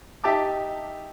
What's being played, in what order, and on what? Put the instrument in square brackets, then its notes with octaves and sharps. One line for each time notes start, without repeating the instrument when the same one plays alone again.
[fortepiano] D#4 G4 E5 A5 D6